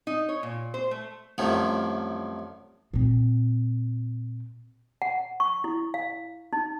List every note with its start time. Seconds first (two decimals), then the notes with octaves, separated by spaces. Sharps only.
0.07 D#4
0.29 C#5
0.43 A#2
0.74 C5
0.91 A3
1.38 C2 F#2 A2 D#3 F3
2.93 A#2 C4
5.02 F#5
5.40 C#6
5.64 E4
5.94 F5
6.53 D#4